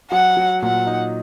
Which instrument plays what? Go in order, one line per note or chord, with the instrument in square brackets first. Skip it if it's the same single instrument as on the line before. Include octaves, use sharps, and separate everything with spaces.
[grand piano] F#3 [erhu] F#5
[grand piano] F#3
[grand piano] A#2 [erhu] F#5
[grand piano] D#4